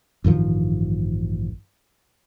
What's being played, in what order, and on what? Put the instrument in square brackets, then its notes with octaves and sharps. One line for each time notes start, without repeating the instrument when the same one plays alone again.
[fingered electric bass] A1 G2 D#3 F3